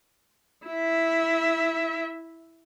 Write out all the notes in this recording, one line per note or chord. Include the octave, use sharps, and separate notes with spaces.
E4 E5